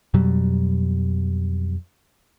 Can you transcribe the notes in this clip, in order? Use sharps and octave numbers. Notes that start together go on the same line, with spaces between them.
F2 B2 F#3 G3